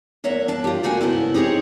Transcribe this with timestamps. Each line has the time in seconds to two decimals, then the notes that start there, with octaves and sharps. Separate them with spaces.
0.24 E2 A#3 C#5 E5 F#5
0.48 D4 A5
0.64 F4 G4
0.83 D2 A3 A#3 F#4 F5 G#5
1.01 G#2 C#3 B3 D#4 E4
1.34 C4 D#4 G4 G#4 B4 C#5